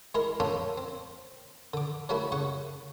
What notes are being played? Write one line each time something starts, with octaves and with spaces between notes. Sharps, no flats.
G#3 E4 G#4 A#4 D#5
A#3 C#4 D4 F4 A4
C4
D3 D6
F#3 G3 A3 A#3 E4 F#4
C#3 F#5 C#6